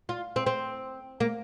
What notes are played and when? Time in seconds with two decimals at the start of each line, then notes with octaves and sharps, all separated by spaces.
0.09 F4
0.36 C4
0.46 C4
1.20 A#3